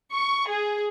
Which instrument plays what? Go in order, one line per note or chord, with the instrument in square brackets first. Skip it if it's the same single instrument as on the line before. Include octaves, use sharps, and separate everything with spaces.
[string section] C#6
G#4